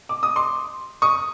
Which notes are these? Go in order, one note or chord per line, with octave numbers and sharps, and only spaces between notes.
D6
D#6
C6 D6
C#6 D#6